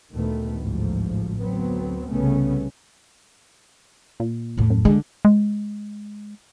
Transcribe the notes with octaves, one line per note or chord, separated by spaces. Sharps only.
D2 A#2 D#3 A3 B3
A1 D2 G#2 F3
D2 F#3 B3 C4
C2 C#3 A3 B3 C#4
A#2
E2 A2
F#2
D3 G#3
G#3